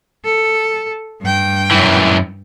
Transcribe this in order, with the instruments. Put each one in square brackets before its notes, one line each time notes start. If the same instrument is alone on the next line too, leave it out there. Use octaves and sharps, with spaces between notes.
[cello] A4
G2 G5
[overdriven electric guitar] F#2 E3